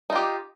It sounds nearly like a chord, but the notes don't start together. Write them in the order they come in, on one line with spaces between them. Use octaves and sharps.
D#4 F4 G4